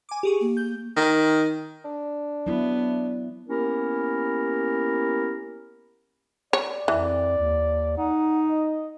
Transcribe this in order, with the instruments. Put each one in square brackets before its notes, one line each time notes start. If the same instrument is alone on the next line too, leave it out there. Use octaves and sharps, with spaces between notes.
[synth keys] G#5 D6
G4 G#4 C#6
[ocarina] A#3
[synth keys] G6
[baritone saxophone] D#3
[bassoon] D4
[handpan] F#3 E4 [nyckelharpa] B3
[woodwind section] A#3 B3 C#4 E4 G4 A#4
[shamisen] C#5 [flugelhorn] D5
[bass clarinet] F2 [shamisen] E3
[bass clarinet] D#2
[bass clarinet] D#4 [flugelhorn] F#5
[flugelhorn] D#5